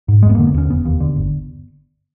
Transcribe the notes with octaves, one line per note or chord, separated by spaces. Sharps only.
G#2
F1 G#3
B3
D3 A#3
B3
D#2 C#4
F1 B3
D#2
D3
G1